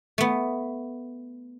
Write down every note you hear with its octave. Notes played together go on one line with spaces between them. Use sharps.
A3 B3